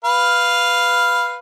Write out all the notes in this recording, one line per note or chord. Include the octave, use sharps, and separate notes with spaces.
B4 F5